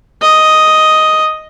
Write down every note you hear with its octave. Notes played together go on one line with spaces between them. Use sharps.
D#5